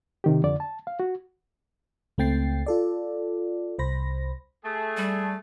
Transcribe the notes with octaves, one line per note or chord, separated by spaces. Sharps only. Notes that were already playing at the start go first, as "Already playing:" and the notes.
C3 D#3 G4
F2 D3 D5
A5
F5
F#4
C#2 A3 C4 G5 A6 C7
F4 A4 D5
C2 C5 B5 A#6
A3 G#4
G3